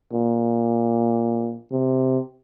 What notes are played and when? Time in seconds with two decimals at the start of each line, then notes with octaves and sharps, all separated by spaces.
0.13 A#2
1.72 C3